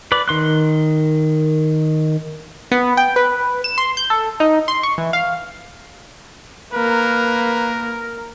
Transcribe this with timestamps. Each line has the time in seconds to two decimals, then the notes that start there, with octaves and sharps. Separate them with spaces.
0.12 B4 D5
0.28 D#3 C6 F#6
2.71 B3
2.97 G5
3.16 B4
3.64 E7
3.78 C6
3.97 G6
4.10 A4
4.40 D#4
4.68 C6
4.83 C#6
4.98 E3
5.13 F5
6.73 A#3 A#4 B4